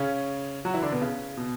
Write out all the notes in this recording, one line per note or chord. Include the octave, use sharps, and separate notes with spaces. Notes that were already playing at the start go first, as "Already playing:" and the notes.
Already playing: C#3 C#4
F#3 F#4
E3 E4
D3 D4
B2 B3
C#3
B2